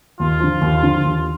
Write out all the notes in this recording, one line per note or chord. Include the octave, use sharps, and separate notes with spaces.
D#2 F4
D3 F3
D#2
D3 F3
D#2